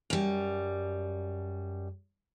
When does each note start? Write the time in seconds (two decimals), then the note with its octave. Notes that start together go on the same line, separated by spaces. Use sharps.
0.10 F#2 G3